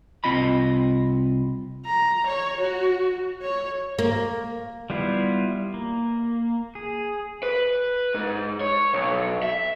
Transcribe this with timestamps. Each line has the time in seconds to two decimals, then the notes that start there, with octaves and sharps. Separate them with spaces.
0.24 C2 C4 F4 D#5 B5
1.85 A#5
2.27 C#5
2.61 F#4
3.42 C#5
3.99 A#3
4.90 G3 B3 E4 F4
5.74 A#3
6.75 G#4
7.43 B4
8.14 G#2
8.60 C#5
8.93 B1
9.43 E5